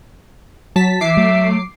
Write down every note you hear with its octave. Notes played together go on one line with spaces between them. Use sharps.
F#3 A5 B6
E3 E5 D6 C7
F#3 A3